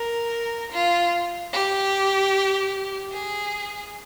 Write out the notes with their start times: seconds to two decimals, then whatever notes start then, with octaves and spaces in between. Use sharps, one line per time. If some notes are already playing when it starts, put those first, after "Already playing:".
Already playing: A#4
0.72 F4
1.53 G4
3.12 G#4